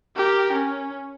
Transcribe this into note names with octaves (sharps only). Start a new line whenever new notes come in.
G4 A#4
C#4